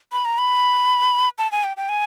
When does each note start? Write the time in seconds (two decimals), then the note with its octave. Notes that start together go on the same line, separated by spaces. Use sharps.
0.12 B5
0.25 A#5
0.38 B5
1.38 A5
1.52 G#5
1.64 G5
1.77 G5
1.89 G#5